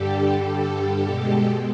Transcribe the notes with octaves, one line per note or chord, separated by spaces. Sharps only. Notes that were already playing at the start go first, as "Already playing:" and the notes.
Already playing: G2 D3 G3 G4 A4
B2 G#3